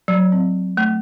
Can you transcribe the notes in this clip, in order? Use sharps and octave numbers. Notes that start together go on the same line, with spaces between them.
F#3
C4
A3